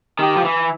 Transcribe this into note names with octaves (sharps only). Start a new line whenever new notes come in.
D#3 G4
F3
E3